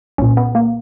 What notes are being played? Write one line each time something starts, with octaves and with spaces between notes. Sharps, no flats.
C2 A#2 C#4
B3
A#3